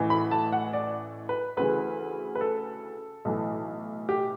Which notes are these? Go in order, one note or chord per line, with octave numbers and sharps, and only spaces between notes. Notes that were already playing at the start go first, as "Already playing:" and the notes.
Already playing: A1 A2 E3
B5
A5
F#5
D5
B4
D2 C#3 E3 B4
B4
A4
B1 A2 E3
G4